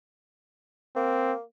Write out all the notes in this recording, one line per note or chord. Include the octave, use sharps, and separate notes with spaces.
A#3 C4